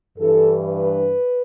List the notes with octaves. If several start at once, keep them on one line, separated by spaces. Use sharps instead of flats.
G2 E3 A4
B4